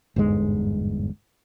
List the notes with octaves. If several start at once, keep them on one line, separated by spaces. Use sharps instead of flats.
G1 E2 G#2 G#3